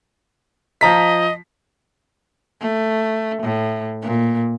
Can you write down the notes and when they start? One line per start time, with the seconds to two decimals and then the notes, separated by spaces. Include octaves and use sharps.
0.81 F3 D#5 A#5 B6
2.61 A3
3.42 A2
4.02 A#2